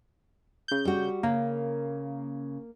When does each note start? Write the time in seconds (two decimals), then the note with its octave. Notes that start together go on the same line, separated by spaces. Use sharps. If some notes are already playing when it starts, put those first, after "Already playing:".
0.68 C#3 G6
0.85 G3 F#4
1.23 C#3 A#3